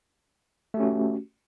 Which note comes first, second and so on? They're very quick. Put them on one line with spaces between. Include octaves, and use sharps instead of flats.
A3 G4 C#4 F#4